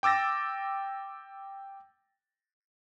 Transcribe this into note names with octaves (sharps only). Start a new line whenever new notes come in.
G5 D6 E6 A6 A#6